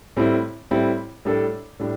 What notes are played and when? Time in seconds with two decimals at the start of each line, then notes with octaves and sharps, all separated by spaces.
0.17 A2 G3 C4 E4
0.71 A2 G3 C4 E4
1.25 A2 G3 D4 A4 D5
1.80 A2 G3 D4